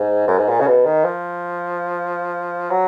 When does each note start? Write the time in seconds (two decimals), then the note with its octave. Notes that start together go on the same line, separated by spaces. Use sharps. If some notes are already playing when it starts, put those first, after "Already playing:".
Already playing: G#2
0.28 F#2
0.38 G#2
0.49 A#2
0.60 C#3
0.68 B2
0.86 D#3
1.04 F3
2.71 F#3